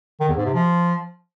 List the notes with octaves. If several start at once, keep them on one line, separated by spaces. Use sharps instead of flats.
D#3
E2
G#2
C3
F3